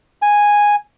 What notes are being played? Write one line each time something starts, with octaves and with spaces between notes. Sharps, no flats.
G#5